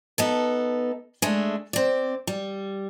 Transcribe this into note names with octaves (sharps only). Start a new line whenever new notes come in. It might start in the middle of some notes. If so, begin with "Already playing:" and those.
B3 D#4 A4
G#3 A3 D4
C4 D5
G3